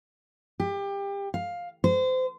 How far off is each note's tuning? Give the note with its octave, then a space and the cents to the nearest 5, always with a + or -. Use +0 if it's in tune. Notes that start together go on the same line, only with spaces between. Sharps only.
G4 +25
F5 +10
C5 -30